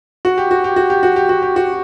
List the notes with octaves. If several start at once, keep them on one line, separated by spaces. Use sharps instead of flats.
F#4
G4
F#4
G4
F#4
G4
F#4
G4
F#4
G4
F#4